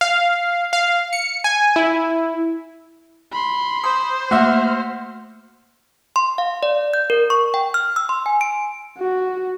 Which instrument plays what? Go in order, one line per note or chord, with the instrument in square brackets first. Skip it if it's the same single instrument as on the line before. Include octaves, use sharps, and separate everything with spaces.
[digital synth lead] F5
F5
C#7
G#5
E4
[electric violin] B5 C6
[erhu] C5 [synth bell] D#6
[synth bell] A3 A#3 [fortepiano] F#4 E5 [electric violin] F6
[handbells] C6
F5
D5
G6
A#4
C#6
G5
F6
E6
C6
G#5
D7
[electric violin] F#4